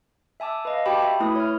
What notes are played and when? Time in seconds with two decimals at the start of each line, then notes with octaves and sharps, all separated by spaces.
0.40 E5 G#5 A5 D6 E6
0.65 B4 D#5 F5
0.86 F#4 G4 G5 A5 B5 D6
1.01 E5 B5
1.20 A3 E4 B4 D#6
1.36 C#5 F6